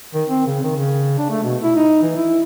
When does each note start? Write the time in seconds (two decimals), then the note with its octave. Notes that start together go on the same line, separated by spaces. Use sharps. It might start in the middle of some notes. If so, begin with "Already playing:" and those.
0.14 D#3
0.29 C4
0.47 C#3
0.64 D#3
0.76 C#3
1.18 D4
1.30 A3
1.44 B2
1.63 E4
1.76 D#4
2.02 E3
2.17 E4